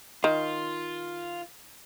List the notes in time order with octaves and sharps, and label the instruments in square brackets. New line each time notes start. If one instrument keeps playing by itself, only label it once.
[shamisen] D#3 [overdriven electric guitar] F4